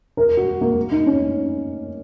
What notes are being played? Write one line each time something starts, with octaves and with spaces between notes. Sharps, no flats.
A#4
F#4
A#3
D#4
C#4